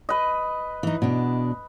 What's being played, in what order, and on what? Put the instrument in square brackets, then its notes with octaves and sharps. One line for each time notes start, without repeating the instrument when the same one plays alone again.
[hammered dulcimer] B4 D#5
[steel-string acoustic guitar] E3 D#4
B2 D4